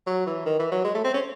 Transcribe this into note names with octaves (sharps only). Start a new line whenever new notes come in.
F#3
E3
D#3
E3
F#3
G#3
A3
C4
C#4